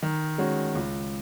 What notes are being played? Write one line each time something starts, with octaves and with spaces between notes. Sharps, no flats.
D#3
G#3 C#4 F#4
C#2